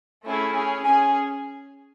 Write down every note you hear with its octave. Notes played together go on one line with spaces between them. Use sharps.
A3 C#4 E4 G#4
C#4 G#4
C#4 G#4 G#5